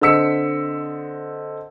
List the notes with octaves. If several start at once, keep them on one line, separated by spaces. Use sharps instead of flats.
D3 C4 D#5 E6 B6 C#7